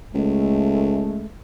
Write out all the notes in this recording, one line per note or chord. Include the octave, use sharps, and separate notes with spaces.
C#2 G#3 A3